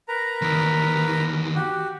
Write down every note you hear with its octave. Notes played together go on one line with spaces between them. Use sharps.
A#4 B4 A#5
E2 D#3
F#4 G4